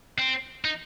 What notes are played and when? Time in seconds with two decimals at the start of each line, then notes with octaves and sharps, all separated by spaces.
0.19 C4
0.64 D#4